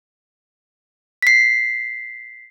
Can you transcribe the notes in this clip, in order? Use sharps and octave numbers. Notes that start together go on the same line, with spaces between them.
B6 C7